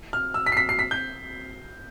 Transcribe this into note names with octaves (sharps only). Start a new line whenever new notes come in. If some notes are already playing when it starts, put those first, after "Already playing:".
F6
E6
B6
C7
B6
C7
B6
G6